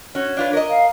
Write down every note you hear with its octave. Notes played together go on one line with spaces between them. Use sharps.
C#4 F#4 C#5
D4 F4 B4
A#4 D5 D#5
F5